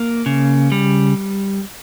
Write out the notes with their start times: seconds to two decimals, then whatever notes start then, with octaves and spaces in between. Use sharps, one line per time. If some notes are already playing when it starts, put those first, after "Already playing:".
Already playing: A#3
0.26 C#3
0.72 G3